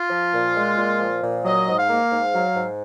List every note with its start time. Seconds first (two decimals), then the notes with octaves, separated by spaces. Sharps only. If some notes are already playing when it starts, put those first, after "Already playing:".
Already playing: F4
0.10 F3
0.33 A#2
0.55 G#3
0.77 A#2
0.99 F3
1.22 A#2
1.44 F#3 D#5
1.67 G#2
1.78 F5
1.89 A#3
2.11 G#2
2.34 F#3
2.56 G#2